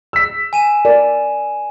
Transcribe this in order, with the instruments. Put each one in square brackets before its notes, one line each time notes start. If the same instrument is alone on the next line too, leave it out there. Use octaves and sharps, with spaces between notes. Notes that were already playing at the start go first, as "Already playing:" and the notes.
[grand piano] E6 B6
[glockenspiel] G#5 D#7 E7
[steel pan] A#4 D5